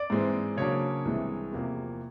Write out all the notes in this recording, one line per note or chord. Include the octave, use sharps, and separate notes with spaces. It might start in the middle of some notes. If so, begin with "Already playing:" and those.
Already playing: D5
G#2 E3 G#3 C4
C#3 F#3 A#3 D4 C#5
C2 C3 E3 G#3
E2 C3 F3 A#3